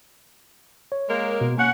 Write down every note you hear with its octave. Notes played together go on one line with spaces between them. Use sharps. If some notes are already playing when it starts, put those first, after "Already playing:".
C#5
G#3 A#3 A#4
B2
A#3 C#4 F#5